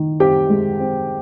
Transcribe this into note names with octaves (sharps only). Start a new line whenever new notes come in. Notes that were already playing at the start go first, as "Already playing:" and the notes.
Already playing: D#3
C4 G4 G5
G#3
C4